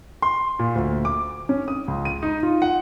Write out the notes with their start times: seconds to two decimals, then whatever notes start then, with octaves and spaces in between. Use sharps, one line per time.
0.22 C6
0.59 A#2
0.75 D2
1.05 D6
1.49 C#4
1.68 D#6
1.88 C#2
2.05 D#7
2.23 D#4
2.43 F4
2.62 F#5